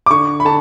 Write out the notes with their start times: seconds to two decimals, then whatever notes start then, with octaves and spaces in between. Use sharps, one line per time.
0.06 D6
0.10 D3 C#6
0.40 B5
0.45 D3 A5